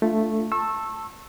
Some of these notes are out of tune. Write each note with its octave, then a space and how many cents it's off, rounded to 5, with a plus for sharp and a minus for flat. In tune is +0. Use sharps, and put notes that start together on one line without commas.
A3 +0 D4 -5 F4 -10
A5 +10 C#6 -30 E6 +0